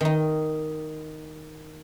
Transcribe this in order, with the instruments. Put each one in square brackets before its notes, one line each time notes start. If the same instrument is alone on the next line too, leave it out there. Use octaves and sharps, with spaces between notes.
[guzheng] D#3 D#4